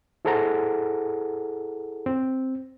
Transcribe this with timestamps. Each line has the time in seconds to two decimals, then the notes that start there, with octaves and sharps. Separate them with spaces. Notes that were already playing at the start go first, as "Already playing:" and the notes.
0.25 E4 G#4 A4 C5 F#5 A#5
2.06 C4